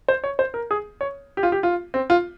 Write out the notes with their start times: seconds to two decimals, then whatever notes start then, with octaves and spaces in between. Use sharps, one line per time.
0.08 C5
0.24 C#5
0.39 C5
0.54 A#4
0.71 G#4
1.01 C#5
1.37 G4
1.43 F4
1.52 G4
1.63 F4
1.94 C4
2.10 F4